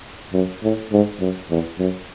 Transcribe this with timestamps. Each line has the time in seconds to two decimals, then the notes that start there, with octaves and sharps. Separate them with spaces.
0.33 F#2
0.63 A2
0.92 G#2
1.20 F#2
1.50 E2
1.79 F#2